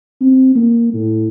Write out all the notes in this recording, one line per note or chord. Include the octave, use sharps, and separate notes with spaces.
C4
A#3
A2